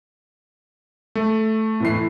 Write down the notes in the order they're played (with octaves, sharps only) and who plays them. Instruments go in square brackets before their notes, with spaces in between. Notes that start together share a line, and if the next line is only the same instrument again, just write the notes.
[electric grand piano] A3
[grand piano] A2 E3 C7